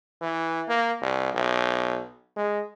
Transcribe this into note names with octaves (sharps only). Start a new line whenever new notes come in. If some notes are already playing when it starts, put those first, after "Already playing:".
E3
A#3
C2
B1
G#3